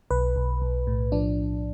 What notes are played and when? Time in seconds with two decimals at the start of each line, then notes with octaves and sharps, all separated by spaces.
0.11 B1 B4
0.36 B1
0.62 B1
0.87 A2
1.12 F3 D4